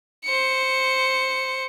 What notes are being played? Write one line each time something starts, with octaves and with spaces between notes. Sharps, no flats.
C5 C#7